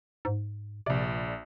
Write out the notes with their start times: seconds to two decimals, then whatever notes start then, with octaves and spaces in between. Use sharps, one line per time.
0.25 G#2
0.86 A#1 C3 D5